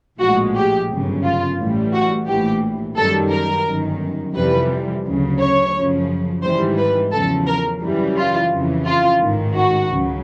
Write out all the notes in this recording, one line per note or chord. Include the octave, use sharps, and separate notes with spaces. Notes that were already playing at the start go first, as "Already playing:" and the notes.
A#1 A2 F3 G#3 F#4
G4
G1 F#2 C#3
F4
A1 A2 E3 G3
F#4
A#1 A2 E3 G4
F#2 D#3 G3 A4
A#4
G1 F#2 D#3
F2 C3 E3 G3 B4
D2 C#3 F#3
C#5
F#2 C#3 F3
G#1 G#2 E3 G3 C5
B4
E2 C#3 F3 A4
A#4
F#2 C#3 E3 G3
F4
F2 C#3 E3
F4
A1 G#2 D#3
F#4
C#2 C#3 F#3